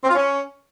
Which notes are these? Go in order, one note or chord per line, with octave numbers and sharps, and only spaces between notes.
C4
F4
C#4